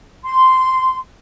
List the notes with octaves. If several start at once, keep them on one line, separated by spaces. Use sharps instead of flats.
C6